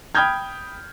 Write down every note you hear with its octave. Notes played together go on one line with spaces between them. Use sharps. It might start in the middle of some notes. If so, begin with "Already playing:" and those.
G5 B5 D#6 F6 G6 G#6